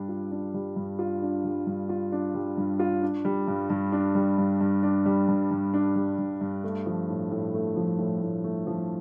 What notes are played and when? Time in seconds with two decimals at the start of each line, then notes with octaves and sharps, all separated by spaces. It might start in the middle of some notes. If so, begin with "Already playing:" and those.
Already playing: G2 G3 D4
0.09 F4
0.31 D4
0.54 G3
0.76 G2
0.99 F4
1.22 D4
1.44 G3
1.67 G2
1.89 F4
2.12 D4
2.34 G3
2.57 G2
2.79 F4
3.02 D4
3.25 G3
3.48 G2
3.70 G2
3.92 D4
4.15 G3
4.38 G2
4.60 G2
4.83 D4
5.05 G3
5.28 G2
5.51 G2
5.74 D4
5.96 G3
6.18 G2
6.41 G2
6.63 A3
6.86 F3
7.08 A2
7.31 A2
7.54 A3
7.76 F3
7.99 A2
8.22 A2
8.44 A3
8.67 F3